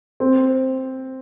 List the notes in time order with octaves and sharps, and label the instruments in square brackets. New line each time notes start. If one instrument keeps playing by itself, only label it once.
[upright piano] C4